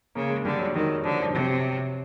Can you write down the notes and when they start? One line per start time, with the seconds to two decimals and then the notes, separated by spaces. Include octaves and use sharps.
0.15 C#3 A#3
0.30 G#3
0.45 D3 G3
0.59 F#3
0.75 D#3 F#3
1.04 D3 F3
1.22 F3
1.33 C3 F#3